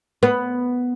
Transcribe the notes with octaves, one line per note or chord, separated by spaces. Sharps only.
B3